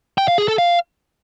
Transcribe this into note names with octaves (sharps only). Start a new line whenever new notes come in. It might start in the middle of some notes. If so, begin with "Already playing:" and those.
G5
F5
G#4
A4
F5